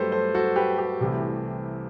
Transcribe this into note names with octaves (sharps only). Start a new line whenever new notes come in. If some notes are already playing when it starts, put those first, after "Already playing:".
Already playing: G2 F#3 A3 G4 A4 B4 C5
A4 C5
F#4 A4
G4 B4
G4
C2 C3 E3 A3